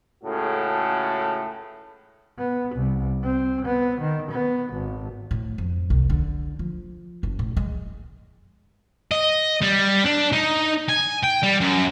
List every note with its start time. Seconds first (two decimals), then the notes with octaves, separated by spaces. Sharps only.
0.24 C#2 A2 C#3 F#4 A4
2.38 B3
2.75 C2
3.23 C4
3.65 B3
4.01 D#3
4.31 B3
4.73 G#1
5.31 A2
5.58 F2
5.90 C2
6.10 D3
6.59 F3
7.23 F#1
7.39 A2
7.57 G#3
9.12 D#5
9.62 G3
10.06 D4
10.33 D#4
10.88 G#5
11.23 G5
11.43 G3
11.61 F#2